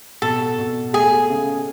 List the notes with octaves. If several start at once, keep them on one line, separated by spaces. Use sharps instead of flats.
B2 A4
B2
A3 G#4
C#3